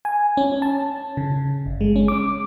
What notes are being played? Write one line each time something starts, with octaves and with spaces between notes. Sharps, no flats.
G#5
C#4
A5
C#3
G1
G#3
C#4
D6